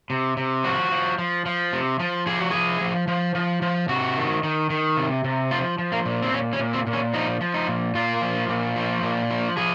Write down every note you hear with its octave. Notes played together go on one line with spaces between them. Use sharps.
C3
C3
F3 F#4
F3
F3
F3
C3
F3
F3 G#4
F#4
F3 G#4
F3
F3
F3
F3
C3 F#4
D#3
D#3
D#3
C3
C3
F3 F4
F3
A#3
A#2
C4
A#2 C#4
C#4
A#2
C4
A#2
C#4
F3 D#4
F3
D#4
A#2
A#2 F4
F3
A#2
F3
A#2
F3
F3 G#4